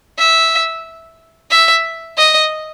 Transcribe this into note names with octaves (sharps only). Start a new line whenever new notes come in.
E5
E5
D#5